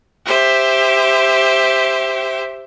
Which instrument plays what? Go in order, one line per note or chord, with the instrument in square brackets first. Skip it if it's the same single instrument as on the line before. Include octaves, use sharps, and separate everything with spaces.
[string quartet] G4 C5 E5